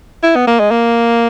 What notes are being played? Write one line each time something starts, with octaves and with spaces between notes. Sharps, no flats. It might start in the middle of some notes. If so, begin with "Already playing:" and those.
E4
B3
A#3
G#3
A#3